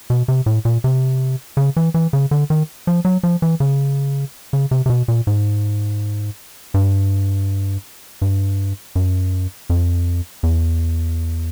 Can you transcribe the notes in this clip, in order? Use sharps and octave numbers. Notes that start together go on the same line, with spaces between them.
B2
C3
A2
A#2
C3
C#3
E3
E3
C#3
D3
D#3
F3
F#3
F3
E3
C#3
C#3
C3
C3
B2
A#2
G#2
G2
G2
F#2
F2
E2